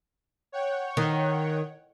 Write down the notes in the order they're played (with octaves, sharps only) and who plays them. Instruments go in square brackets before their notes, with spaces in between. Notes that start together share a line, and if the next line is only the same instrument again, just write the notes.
[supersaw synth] C#5 F#5 G5
[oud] D#3